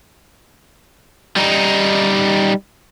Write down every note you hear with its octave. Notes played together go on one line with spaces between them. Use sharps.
G3 D#4